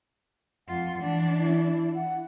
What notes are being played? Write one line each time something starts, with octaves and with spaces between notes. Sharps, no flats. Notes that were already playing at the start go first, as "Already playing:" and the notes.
F2 F4 F#5
E3 D4
E4
F#5